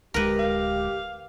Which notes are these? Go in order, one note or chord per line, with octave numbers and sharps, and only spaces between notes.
D1 D2 G#3 G4 A#4 B4
F5